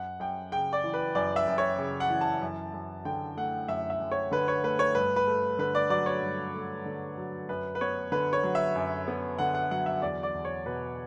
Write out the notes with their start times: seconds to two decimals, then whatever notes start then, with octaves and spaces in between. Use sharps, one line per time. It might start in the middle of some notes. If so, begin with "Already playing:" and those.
Already playing: F#2 F#5
0.20 F#2 G5
0.52 C#3 G5
0.73 D5
0.84 E3
0.94 B4
1.15 F#2 D5
1.36 E5
1.47 F#2
1.58 C#5
1.78 C#3
2.00 F#5
2.10 E3
2.21 A5
2.42 F#2
2.74 F#2
3.05 D3 G5
3.37 A3 F#5
3.68 F#2 E5
3.90 E5
4.00 F#2
4.11 C#5
4.31 D3 B4
4.48 C#5
4.64 A3 B4
4.79 C#5
4.95 G2 B4
5.16 B4
5.27 A3
5.59 D3 B4
5.75 D5
5.90 F#3 D5
6.06 C#5
6.22 G2
6.54 A3
6.86 D3
7.18 F#3
7.49 F#2 B4
7.75 B4
7.81 B3 C#5
8.12 D3 B4
8.33 C#5
8.44 F#3
8.55 E5
8.75 F#2
9.08 B3
9.38 D3 F#5
9.54 F#5
9.71 F#3 F#5
9.86 E5
10.02 E2 D5
10.23 D5
10.34 E2
10.45 C#5
10.66 B2 B4